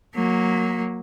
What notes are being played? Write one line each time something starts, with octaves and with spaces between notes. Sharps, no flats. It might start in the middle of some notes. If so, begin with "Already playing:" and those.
F#3 A#3